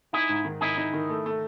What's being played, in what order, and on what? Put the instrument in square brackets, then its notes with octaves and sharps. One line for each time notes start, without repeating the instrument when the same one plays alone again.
[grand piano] D#4 [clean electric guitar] E4 G#4
[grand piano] G#2
D#3
[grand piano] D#4 [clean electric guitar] E4 G#4
[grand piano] D#4
D#3
A3
A3